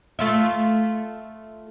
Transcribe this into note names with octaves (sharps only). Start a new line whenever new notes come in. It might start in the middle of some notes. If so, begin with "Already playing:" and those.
A3 F4 E5